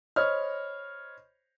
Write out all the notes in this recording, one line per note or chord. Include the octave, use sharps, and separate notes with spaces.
C5 C#5 D#5 B5 F6